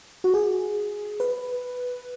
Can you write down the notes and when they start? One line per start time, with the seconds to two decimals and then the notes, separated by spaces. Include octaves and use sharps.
0.24 F#4
0.34 G#4
1.20 B4